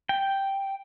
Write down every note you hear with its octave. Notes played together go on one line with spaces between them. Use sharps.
G5